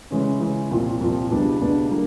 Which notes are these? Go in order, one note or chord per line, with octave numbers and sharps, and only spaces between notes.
C#3 E3 G#3 C#4
C#3 E3 G#3 C#4
C2 A#2 F3
C2 A#2 F3
C#2 B2 G3 B3 D4
C#2 B2 G3 B3 D4
D3 G3 A#3